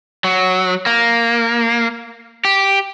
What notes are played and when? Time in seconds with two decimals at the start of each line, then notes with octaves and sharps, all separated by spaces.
0.24 F#3
0.86 A#3
2.45 G4